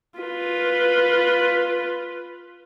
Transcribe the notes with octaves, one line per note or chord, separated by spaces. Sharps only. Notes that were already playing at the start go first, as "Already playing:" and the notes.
F4 B4